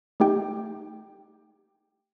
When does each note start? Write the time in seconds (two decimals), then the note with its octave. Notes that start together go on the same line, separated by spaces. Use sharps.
0.20 A3 D#4 G4 G5